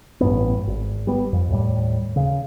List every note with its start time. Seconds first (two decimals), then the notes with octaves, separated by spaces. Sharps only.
0.21 A1 G2 B3
0.67 G#1
1.07 G3 B3
1.33 F2
1.50 D#2 A2 G3
2.16 C#3